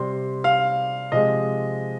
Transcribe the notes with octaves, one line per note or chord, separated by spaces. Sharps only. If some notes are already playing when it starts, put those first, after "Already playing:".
Already playing: C3 G3 C6
F5
C3 F3 G#3 D#5